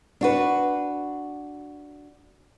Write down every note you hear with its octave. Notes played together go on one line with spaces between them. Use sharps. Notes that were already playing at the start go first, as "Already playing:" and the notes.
D4 F#4 B4